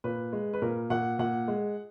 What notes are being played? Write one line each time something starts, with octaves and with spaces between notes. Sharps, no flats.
A#2 B4
G#3
B4
A#2 A#4
A#2 F#5
A#2 F#5
G#3